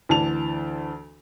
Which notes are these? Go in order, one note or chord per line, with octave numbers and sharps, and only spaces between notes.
D2 E3 A5 F7